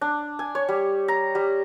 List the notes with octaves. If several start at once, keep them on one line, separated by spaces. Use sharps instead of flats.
D4
G#5
C#5
G3
A#5
G3